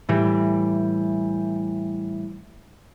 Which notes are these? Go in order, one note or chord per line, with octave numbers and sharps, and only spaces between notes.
A2 E3 G3